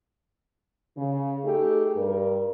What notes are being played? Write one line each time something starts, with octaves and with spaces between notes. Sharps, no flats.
C#3
A3 D#4 G4 G#4
G2 A#4